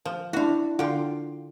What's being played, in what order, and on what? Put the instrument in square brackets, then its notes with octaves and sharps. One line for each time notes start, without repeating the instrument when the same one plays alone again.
[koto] F3
[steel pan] D4 E4 [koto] F#4 F5
[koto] D3 G5 [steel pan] F4